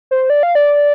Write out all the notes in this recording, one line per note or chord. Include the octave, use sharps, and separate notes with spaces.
C5
D5
F5
D5